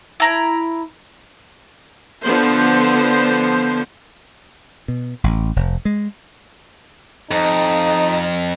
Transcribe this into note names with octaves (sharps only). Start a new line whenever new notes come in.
E4 A#5 B5
D3 F3 B3 C5
B2
A1
F1
G#3
F2 D#4